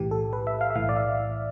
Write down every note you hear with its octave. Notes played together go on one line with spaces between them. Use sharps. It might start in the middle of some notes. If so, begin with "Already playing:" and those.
Already playing: B1 A2 E3 G4
A4
B4
E5
F5
E5
B1 A2 E3 F5
D5
E5